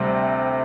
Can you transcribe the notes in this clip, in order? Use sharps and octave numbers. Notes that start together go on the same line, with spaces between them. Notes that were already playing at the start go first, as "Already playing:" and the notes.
Already playing: D2 C3 G3